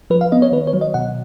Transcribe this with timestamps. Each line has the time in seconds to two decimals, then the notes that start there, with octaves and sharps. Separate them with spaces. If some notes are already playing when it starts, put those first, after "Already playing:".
0.10 F3 B4
0.21 F5
0.32 B3 D#5
0.42 C#5
0.52 D#3 B4
0.67 C#5
0.73 F#3
0.81 D#5
0.94 B2 F#5